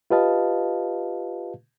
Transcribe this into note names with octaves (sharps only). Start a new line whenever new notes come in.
F4 G4 B4 D#5 F5 A5